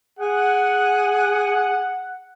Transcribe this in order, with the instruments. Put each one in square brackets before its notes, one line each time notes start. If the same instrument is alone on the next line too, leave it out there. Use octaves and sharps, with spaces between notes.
[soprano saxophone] G#4 [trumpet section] F#5